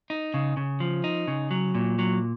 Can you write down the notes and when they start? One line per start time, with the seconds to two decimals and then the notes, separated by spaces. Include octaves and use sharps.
0.10 D#4
0.34 C#3
0.57 C#3
0.80 F3
1.04 D#4
1.27 C#3
1.51 F#3
1.75 A#2
1.99 F#3